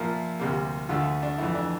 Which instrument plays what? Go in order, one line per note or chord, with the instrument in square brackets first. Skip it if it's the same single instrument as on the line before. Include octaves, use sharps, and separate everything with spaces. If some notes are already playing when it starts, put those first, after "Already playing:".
Already playing: [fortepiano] A#2 F3 A#3 E4
D2 C3 G3 A#3
D2 D3 A3 F4
D4
F2 E3 A3 E4
D4